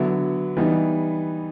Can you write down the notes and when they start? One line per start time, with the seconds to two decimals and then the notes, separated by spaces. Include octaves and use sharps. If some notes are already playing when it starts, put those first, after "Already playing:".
Already playing: D3 F#3 B3 E4
0.57 E3 G3 B3 D#4